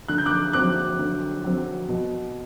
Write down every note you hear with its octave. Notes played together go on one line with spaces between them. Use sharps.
D3 F#6
G6
D6 F#6
F#3 C4 D6 F#6
D3
F#3 C4
B2